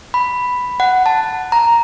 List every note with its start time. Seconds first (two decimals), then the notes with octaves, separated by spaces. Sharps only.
0.14 B5
0.80 F#5
1.06 A5
1.52 A#5